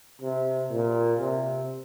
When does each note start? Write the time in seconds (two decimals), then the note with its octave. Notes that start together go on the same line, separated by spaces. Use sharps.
0.21 C3
0.70 A#2
1.19 C3